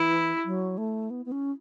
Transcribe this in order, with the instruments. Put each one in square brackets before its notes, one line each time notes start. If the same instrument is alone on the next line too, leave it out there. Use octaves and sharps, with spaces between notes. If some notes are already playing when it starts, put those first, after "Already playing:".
Already playing: [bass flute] E3 [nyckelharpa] E4
[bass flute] F#3
A3
B3
B3
C#4